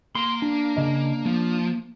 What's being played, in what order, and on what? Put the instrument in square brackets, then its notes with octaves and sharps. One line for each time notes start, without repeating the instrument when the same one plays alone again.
[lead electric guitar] A#3 [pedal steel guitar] C6
[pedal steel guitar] D4
[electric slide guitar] C#3 D#5
[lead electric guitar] F3 [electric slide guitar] A#3